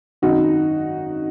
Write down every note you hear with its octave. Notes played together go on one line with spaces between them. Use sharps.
G#1 F#2 D#3 D#4 F#4